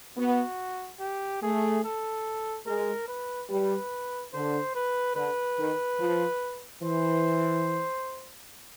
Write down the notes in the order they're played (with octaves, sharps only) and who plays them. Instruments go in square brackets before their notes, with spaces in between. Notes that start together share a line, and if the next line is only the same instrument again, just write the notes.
[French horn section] B3 [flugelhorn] F#4
[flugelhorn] G4
[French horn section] A3 [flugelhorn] G#4
[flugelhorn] A4
[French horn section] G#3 [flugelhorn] A#4
[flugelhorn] B4
[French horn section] G3 [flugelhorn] B4
[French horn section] D3 [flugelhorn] C5
[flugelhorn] B4
[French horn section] D3 [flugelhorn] B4
[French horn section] D#3
F3
[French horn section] E3 [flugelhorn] C5